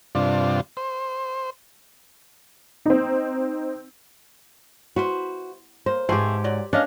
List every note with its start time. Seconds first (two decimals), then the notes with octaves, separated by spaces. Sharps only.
0.15 G2 C3 D4 F4
0.77 C5
2.86 C4 D#4
4.96 E4 F#4 B4 C5
5.86 A#3 C5
6.09 G#2 G#3 A3 C4 G4 G#4 C5
6.44 F#3 D5
6.73 A#3 C#4 D4 D#5 F5